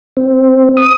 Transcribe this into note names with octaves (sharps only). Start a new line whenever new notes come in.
C4
D#6